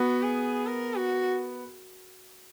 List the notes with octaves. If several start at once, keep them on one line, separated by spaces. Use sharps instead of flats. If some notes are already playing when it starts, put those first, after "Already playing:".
Already playing: B3 F#4
G#4
A#4
F#4